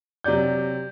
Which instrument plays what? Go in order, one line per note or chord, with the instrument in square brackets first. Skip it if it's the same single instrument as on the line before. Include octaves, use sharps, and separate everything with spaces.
[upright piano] C3 F#3 D5 G6